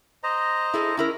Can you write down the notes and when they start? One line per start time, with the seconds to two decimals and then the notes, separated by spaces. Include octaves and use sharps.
0.23 C5 D#5 A#5
0.74 E4 G#4 A4
0.97 C#4 E4 A#4